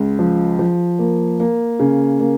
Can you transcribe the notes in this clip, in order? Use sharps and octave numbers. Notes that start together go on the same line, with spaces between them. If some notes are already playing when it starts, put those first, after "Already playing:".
Already playing: C#2
F3
F3
A#3
A#3
C#3
A#3